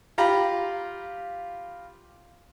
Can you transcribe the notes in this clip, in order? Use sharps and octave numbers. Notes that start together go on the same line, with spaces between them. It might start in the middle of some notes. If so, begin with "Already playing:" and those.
F4 G4 F5 A#5 B5